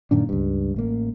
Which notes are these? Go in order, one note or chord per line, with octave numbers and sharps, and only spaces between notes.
F#2 A#2 D#3 D4
C#2 G2
A1 A#3